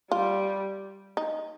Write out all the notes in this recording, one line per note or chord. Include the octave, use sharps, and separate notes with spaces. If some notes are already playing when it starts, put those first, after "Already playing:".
G3 F4
D#4